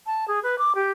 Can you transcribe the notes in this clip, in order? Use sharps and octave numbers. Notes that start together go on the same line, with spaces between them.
A5
G#4
B4
D6
G4